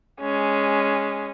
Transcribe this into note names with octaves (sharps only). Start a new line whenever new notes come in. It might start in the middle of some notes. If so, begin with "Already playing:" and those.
G#3 C#4